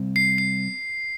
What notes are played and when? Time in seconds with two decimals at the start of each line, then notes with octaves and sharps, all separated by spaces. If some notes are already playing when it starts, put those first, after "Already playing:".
Already playing: C3 G3 C4
0.16 C7
0.38 C7